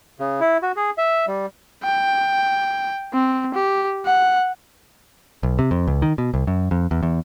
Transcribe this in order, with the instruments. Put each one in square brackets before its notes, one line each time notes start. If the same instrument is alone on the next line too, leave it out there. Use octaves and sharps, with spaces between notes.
[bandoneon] C#3
E4
F#4
G#4
E5
G3
[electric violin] G5
C4
G4
F#5
[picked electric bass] B1
C3
F2
C#2
D#3
B2
C2
F#2
F2
E2
E2